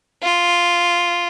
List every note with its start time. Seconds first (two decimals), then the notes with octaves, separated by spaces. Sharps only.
0.23 F4